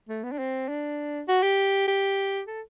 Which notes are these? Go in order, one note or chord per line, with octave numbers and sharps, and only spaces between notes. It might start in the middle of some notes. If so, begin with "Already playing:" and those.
A3
B3
D4
C4
D4
F#4
G4
G4
A4